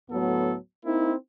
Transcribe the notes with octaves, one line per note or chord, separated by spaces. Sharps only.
D2 A2 F#3 B3 A4
A#3 C4 D#4 E4